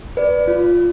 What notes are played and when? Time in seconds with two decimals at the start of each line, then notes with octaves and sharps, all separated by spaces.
0.17 B4 D5
0.48 F4